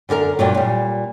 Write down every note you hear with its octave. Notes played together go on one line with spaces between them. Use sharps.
F#2 D3 F#4 A#4
G2 A#2 F#3
A#2 G3